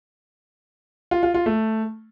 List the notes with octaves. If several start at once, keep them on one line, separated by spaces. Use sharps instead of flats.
F4
F4
F4
A3